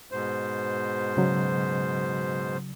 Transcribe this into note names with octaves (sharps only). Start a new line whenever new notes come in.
G#2 B2 C5
C#3 F#3